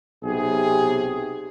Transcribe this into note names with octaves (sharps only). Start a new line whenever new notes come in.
B1 C3 G4 G#4